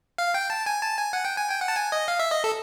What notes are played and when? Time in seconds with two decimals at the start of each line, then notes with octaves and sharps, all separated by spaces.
0.18 F5
0.34 G5
0.50 A5
0.66 G#5
0.82 A5
0.98 G#5
1.13 F#5
1.25 G5
1.37 G#5
1.49 G5
1.61 F#5
1.68 A5
1.76 G#5
1.92 D#5
2.08 F5
2.19 E5
2.31 D#5
2.44 A4